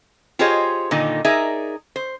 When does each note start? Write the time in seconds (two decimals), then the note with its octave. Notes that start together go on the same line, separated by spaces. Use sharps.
0.39 F4 G4 G#4 C5 C#5 D#5
0.91 A#2 D3 D#3 D#4
1.25 D#4 G#4 A#4 D5 E5
1.96 C5